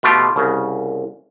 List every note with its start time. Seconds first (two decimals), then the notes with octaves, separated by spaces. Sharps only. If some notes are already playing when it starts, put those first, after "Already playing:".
0.03 B2 A3 F4 G4
0.36 C2 C#3